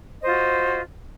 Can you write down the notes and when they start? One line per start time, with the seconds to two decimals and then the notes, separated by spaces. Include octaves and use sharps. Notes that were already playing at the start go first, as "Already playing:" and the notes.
0.19 D#5
0.22 C5
0.26 F4
0.29 F#4